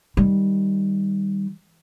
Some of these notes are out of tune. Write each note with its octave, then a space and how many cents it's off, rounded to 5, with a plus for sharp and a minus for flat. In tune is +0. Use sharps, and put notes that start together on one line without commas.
D#3 +0 G3 +0